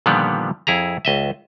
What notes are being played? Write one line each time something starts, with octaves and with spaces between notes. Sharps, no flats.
A#2 D3 D#3 F3 G3 B3
F2 E4 G#4 A#5
C#2 D#5 E5